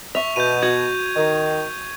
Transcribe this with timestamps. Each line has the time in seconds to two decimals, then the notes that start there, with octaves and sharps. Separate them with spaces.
0.15 E5 C#6 F7
0.36 B2 G6 D#7
0.62 F#4 G#6
1.16 D#3